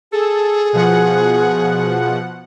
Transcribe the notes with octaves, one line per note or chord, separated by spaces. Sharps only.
G#4 A4
B2 F3 F#5